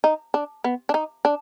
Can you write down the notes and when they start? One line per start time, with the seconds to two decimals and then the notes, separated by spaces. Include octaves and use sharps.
0.04 D#4
0.34 D4
0.64 B3
0.89 D4
0.94 D#4
1.25 D4